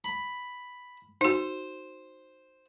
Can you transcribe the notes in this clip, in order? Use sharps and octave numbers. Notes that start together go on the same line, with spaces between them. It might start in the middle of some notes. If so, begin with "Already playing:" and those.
B5
D#4 F#4 C5